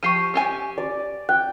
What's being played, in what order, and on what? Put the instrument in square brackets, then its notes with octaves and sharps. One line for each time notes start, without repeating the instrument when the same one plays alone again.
[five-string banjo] F3 G4 [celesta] C#6 C7 D#7
[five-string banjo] C#4 G4 G#5
[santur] D5
[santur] G5 [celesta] F#6